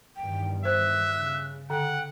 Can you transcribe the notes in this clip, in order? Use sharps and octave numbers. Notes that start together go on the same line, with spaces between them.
E2 G2 D#3 G5
C5 E5 F#6
C#3
D3 F#5 G5